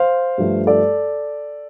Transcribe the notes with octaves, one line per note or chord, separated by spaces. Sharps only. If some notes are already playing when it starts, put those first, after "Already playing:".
Already playing: C5 F5
G2 F3 A3
A4 D5